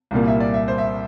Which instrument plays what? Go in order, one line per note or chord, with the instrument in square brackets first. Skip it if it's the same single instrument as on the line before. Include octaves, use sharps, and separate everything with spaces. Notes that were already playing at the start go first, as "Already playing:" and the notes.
[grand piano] C2 A#2 G3 A#3 F5
E5
D5
E5
C5
E5